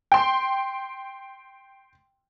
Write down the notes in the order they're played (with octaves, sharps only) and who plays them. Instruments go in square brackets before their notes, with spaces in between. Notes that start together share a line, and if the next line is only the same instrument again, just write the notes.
[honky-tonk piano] G5 C6